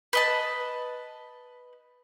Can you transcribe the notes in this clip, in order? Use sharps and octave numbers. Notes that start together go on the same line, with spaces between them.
B4 D#5 A5